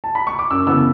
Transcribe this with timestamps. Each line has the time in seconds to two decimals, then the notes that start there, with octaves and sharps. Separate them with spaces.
0.04 A5
0.15 B5
0.27 C#6
0.39 D6
0.50 F#2 E6
0.67 C#3 E3 B3 E6